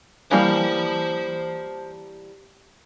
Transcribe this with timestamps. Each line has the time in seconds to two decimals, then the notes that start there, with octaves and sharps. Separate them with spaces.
0.31 E3 G3 A#3 C5 A5